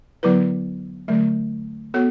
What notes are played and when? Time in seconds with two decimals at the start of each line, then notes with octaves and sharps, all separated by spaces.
0.23 D3 F#3 B3 E4 B4
1.08 D3 F#3 A3
1.94 B3 F#4 A4 C#5